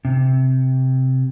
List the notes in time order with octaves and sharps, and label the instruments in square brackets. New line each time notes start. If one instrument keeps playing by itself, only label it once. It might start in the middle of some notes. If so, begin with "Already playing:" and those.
[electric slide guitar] C3